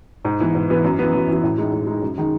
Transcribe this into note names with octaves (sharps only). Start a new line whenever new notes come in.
G#2
E3 B3
G#2
E3 B3
F#2
E3 B3
F#2
E3 B3
A2
G#3 D#4
A2
G#3 D#4
F#2
D#3 G#3 D#4